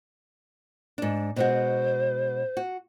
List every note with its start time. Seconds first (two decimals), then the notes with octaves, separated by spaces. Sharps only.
0.98 G#2 D4
1.36 B2 G#3 F#4 C5
2.57 F#4